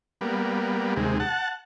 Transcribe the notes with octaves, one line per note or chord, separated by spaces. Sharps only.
G3 A#3 B3
D#2 C3 G#3
F#5 A5